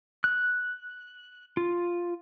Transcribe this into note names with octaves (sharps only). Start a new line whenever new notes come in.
F#6
F4